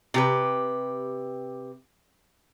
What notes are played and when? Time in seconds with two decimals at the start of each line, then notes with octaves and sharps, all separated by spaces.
0.14 C3 G4 B4